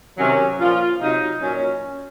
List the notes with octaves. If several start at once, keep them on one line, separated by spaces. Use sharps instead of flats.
C3 D#3 F#3 C#4
A#2 F3 F4
C3 F#3 D#4
A#2 F#3 C#4